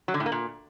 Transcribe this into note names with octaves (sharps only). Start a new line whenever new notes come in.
F#3
D3
A2
A#3
A#2